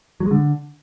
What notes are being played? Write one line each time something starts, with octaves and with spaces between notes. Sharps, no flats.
F#3
G#3
D3